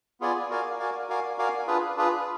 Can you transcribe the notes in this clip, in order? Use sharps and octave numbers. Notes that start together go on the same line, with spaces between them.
B3 F4 G#4 D5 G#5
F#4 A#4 D5 F5 G#5
F#4 A#4 D5 F5 G#5
F#4 A#4 D5 F5 G#5
F#4 A#4 D5 F5 G#5
D4 F4 G#4 B4
D4 F4 G#4 B4